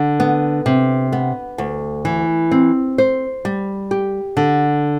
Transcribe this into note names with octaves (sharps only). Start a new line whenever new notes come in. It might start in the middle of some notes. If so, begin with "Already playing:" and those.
Already playing: D3
B3
C3
B3
D2
E3
C4
C5
G3
G4
D3